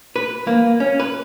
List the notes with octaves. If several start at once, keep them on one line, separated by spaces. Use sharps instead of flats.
B4
A#3
C#4
B4